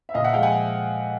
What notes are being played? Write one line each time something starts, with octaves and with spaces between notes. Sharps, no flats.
E5
A#2 D#5 F5
E5 F#5
F3 G#3 F5 G5
F#5 G#5